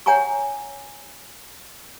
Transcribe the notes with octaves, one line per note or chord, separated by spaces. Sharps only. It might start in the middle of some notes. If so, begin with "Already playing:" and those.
C#5 F#5 G#5 A#5 C#6